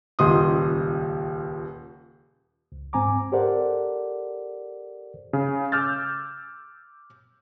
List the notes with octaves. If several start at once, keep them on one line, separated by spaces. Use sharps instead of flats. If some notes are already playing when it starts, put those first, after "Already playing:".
D#1 C#2 C6 D#6
C#2
G#2 C4 G#5 A#5 D6
G4 A4 A#4 C5 D5 F#5
C#3
D6 E6 F6 G6 A6